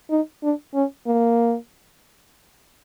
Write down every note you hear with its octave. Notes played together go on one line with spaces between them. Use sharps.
D#4
D4
C#4
A#3